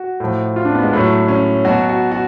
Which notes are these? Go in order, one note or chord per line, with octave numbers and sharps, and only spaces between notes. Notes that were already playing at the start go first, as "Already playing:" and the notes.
Already playing: F#4
A2 F3
F4
D4
B3
G#3
A2 F#3 A3
C#4
B2 F#3 F#4
F#4
F#4